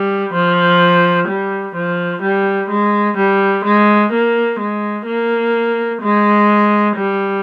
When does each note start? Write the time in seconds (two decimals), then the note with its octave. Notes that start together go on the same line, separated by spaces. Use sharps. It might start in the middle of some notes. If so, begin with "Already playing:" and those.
Already playing: G3
0.33 F3
1.28 G3
1.75 F3
2.22 G3
2.70 G#3
3.17 G3
3.64 G#3
4.12 A#3
4.60 G#3
5.06 A#3
6.02 G#3
6.97 G3